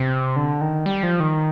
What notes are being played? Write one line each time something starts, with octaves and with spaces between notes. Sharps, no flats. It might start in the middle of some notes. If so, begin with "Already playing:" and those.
Already playing: C3
D3
D#3
G3
F3
D#3